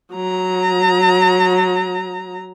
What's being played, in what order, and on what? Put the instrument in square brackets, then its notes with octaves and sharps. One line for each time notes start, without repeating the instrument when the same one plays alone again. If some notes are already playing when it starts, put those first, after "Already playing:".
[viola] F#3 A#5